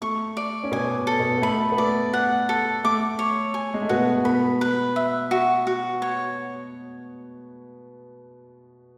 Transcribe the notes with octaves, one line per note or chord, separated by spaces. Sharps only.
A3 C#6
D5
C#4
B2 B3 G#5
A4
B2 B3
B3
A3 B5
B3
A3 D5
F#5
A4
A3 D6
C#5
G#5
G#3
A3
B2 B3 F#4
B2 B3 B5
B4
E5
F#4
F#4
C#5